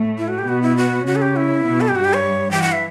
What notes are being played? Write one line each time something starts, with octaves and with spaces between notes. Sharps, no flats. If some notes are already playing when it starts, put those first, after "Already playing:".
Already playing: A2 A3
E4
F#4
G4
B2 B3 F#4
E4
F#4
C#3 C#4 F#4
A4
G4
E4
B2 B3
A4
G4
G2 G3 F#4
G4
C#5
E3 G5
F#5
E5